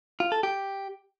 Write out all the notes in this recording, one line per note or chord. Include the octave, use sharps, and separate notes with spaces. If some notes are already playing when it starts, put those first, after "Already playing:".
F4
A4
G4